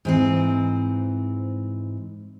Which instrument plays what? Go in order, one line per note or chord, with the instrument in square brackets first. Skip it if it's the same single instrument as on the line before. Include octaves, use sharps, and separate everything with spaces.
[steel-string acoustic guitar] G#2 E3 C4